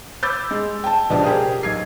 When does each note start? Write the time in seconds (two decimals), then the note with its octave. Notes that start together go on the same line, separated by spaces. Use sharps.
0.23 B5 D6 E6 G6 A6
0.51 G#3
0.84 G5 A5
1.10 C#2 B2 F3 D4 G4 A5
1.23 G4 G#4 A#4 C5 D#6
1.63 B1 G#6 C7